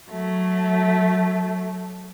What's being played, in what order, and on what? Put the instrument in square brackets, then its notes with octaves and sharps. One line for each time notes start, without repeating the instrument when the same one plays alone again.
[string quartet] F#3 A3